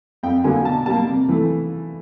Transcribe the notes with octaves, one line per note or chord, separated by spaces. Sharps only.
F2 G5
D3 F#3 A#3 G#5
B2 A5
G3 A#3 A5
C3
E3 A3